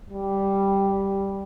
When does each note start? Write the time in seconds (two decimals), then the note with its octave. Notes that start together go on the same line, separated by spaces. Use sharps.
0.10 G3